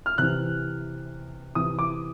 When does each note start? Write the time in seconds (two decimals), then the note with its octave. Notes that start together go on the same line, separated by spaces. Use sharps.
0.06 F6
0.18 C3 E3 F#6
1.55 C3 E3 D#6
1.79 D6